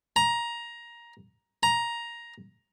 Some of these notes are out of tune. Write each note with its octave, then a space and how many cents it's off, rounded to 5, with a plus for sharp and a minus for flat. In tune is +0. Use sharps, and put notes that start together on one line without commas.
A#5 +15
A#5 +10